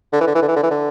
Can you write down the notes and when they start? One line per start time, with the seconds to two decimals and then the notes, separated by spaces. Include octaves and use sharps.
0.13 D3
0.20 E3
0.27 D3
0.35 E3
0.42 D3
0.48 E3
0.55 D3
0.63 E3
0.70 D3